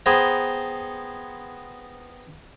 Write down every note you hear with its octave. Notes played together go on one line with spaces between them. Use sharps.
B3 G#4 B4 C5 G5 A#5